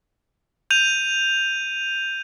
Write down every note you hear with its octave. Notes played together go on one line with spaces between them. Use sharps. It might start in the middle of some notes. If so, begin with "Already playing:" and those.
G6 D#7 F7